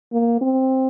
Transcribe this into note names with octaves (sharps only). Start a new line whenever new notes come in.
A#3
C4